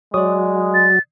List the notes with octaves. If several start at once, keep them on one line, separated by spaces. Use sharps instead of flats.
F#3 G#3 F#4 D5 D#6
A6